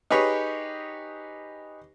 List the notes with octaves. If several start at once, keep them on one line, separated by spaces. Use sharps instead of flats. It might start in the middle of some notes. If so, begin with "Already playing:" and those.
D#4 G4 G#4 B4 C#5